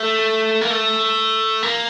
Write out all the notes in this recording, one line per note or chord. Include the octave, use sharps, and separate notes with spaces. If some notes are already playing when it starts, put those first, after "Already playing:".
Already playing: A3
A#3
A3
A#3